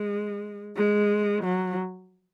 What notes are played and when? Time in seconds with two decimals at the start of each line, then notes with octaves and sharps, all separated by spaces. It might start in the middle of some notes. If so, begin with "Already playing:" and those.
Already playing: G#3
0.76 G#3
1.44 F#3